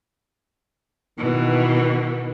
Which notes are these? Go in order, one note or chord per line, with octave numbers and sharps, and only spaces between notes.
B2 D#3 E3